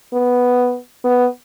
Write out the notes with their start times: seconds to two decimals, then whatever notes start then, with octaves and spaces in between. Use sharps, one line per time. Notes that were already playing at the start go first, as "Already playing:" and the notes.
0.13 B3
1.04 B3